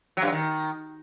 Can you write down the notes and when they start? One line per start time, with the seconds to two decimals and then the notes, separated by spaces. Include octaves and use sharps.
0.17 F#3
0.22 G2
0.27 F#3
0.32 D#3